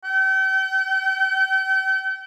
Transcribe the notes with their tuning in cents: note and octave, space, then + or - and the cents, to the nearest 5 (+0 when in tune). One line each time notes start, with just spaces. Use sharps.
G5 -40